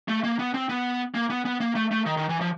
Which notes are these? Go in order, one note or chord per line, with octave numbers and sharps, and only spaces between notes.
A3
A#3
B3
C4
B3
A#3
B3
B3
A#3
A3
A3
D#3
D#3
E3
F3